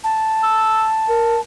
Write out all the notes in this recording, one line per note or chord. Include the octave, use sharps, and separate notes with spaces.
A5
E6
A#4